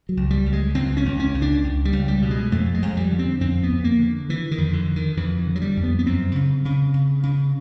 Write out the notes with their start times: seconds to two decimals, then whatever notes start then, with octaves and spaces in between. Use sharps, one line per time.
0.09 F#3
0.17 C#2
0.30 G3
0.46 C#2
0.53 G#3
0.75 C#2 C4
0.97 C#4
1.05 C#2
1.19 C#4
1.34 C#2
1.42 D4
1.64 C#2
1.85 G3
1.93 C#2
2.08 G3
2.22 B2
2.31 G#3
2.52 F2 A3
2.74 G#3
2.82 F2
2.97 G3
3.11 D3
3.19 C4
3.41 F2 C4
3.63 B3
3.70 F2
3.84 A#3
3.99 D3
4.29 D3 E3
4.51 D#3
4.58 F2
4.73 D3
4.88 D3
4.96 D#3
5.17 F2 E3
5.46 D3
5.56 F#3
5.61 G3
5.77 F2
5.83 B3
5.99 B3
6.06 F#2 C4
6.36 C#3
6.65 C#3
6.94 C#3
7.23 C#3